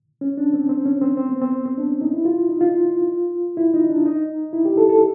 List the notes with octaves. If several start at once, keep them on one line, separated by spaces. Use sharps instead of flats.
C#4
D4
C4
C4
C#4
C4
C4
B3
C4
C4
C4
D4
C#4
D#4
E4
F4
D#4
F4
E4
D#4
D4
D#4
E4
G4
A4
A4